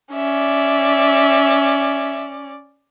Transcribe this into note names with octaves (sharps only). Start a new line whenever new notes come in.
C#4 D5 E5